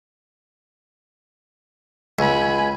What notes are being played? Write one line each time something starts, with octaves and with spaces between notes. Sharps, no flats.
C#2 G#5 B5